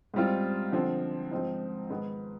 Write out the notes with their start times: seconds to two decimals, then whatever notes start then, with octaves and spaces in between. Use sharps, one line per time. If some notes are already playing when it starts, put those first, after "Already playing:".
0.14 G#2 G3 C4 F4
0.72 D3 F3 C4
1.31 G#2 F3 C4 D#4
1.90 G#2 D#3 G#3 B3